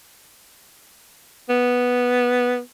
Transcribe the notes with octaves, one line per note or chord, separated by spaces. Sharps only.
B3